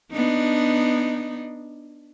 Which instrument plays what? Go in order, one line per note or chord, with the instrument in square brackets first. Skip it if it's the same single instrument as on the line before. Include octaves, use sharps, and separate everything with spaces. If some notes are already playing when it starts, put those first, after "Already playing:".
[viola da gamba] B3 D4 D#4